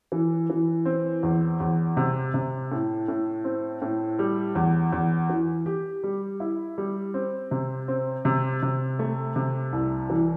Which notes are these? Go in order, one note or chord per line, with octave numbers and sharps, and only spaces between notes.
E3
E3
C4
E2
E2
C3
C3
A2
A2
C4
A2
G3
E2
E2
E3
G4
G3
E4
G3
C4
C3
C4
C3
C3
A3
C3
C2
E3